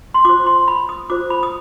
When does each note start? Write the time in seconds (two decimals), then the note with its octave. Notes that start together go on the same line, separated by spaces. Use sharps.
0.14 C6
0.25 F4 C5 D6
0.46 C6
0.68 B5
0.89 D#6
1.10 F4 C5 D6
1.30 B5
1.43 D#6